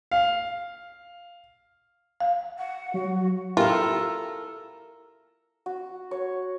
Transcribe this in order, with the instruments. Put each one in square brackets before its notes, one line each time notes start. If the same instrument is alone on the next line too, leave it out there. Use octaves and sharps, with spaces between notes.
[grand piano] F5
[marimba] F5
[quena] F#5
[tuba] F#3 [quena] F#4
[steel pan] E4 G4 F5 [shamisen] F4 [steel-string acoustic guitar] A4 A#4
[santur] F#4
C#5